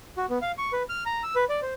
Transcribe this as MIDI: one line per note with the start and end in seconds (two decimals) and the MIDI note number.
0.17 0.26 66
0.30 0.38 59
0.42 0.52 77
0.58 0.72 85
0.73 0.83 71
0.89 1.04 89
1.06 1.23 82
1.23 1.35 88
1.36 1.45 71
1.49 1.60 74
1.62 1.74 72